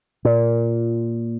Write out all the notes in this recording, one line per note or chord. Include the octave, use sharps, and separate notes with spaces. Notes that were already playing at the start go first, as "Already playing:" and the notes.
A#2